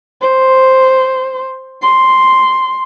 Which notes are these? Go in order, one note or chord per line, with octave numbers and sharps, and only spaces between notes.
C5
C6